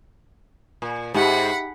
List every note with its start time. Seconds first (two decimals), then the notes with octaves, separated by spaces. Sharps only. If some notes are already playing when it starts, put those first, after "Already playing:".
0.82 A#2
1.14 G#2 D#4 G4 E5 F#5 B5